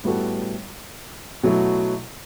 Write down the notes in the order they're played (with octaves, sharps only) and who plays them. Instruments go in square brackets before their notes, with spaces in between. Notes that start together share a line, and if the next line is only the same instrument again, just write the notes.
[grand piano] A2 G3 B3 F#4 A4
B2 F#3 A3 E4